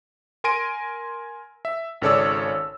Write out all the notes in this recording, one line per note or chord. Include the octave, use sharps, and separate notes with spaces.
A#4 G#5 C6 A#6 D7 D#7
E5
G#1 C#3 A4 C#5 D5 E6